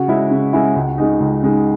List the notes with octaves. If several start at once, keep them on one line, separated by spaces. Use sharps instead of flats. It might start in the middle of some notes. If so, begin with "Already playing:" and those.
Already playing: C#3 F#4
G#3 C#4 E4
C#3
G#3 C#4 E4
C#2
C#3 G#3 D#4
C#2
C#3 G#3 D#4